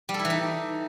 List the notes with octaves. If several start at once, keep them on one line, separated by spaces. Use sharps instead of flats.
G3
A4
E4
E3
D#4